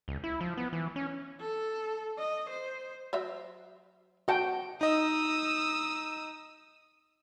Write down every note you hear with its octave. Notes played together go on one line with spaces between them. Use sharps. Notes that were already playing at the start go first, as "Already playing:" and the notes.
C#2
E4
F3
B3
E3
C#4
A4
D#5
C5
F#3 C5 E5
F#4 D#5 F#5 G5 A5
D#4 D#5 D#6 E6